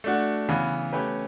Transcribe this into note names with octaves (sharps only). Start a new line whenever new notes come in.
A3 D4 F#4
C#3 E3 B3
A3 C#4 G4 B4